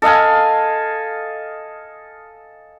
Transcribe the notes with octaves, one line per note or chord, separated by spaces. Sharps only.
A4 D#5 F5 G#5